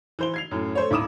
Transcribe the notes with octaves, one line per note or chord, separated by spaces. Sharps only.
E3 C5 G7
G#6 C7 F7
F#2 A2
A3 C5 C#5
D#1 E4 D6 D#6 E7